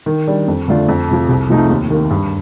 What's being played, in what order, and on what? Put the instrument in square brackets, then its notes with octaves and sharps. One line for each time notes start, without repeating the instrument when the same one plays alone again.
[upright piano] D#3
G3 D4
F2
D3 A3 D4 F4
F2
C3 F3
C2
C3 F3 A3 D#4
D#2
D#3 A#3
G2